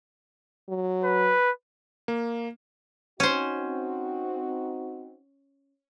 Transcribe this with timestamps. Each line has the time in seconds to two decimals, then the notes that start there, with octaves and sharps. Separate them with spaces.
0.69 F#3
1.04 B4
2.08 A#3
3.20 C4 C#4 D#4 F#4 C5